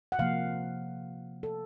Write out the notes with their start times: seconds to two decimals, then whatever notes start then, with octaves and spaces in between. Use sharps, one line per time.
0.12 F#5
0.19 C3 F3 A#3 F5
1.43 A4